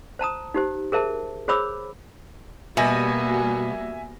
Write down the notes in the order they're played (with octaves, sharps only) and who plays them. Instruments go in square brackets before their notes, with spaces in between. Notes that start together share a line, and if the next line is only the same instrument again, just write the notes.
[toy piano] C5 A5 A#5 D#6
D#4 G4 C5
G#4 A#4 C5 E5 A5
G#4 C5 C#5 B5 D6 E6
[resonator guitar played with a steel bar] B2 [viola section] G3 A#3 F#4 [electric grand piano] E5 G#5 A#6